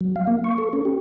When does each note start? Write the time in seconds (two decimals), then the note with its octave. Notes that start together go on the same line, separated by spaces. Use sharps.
0.01 F#3
0.16 F5
0.27 A#3
0.44 C#6
0.58 A4
0.73 C#4
0.85 G4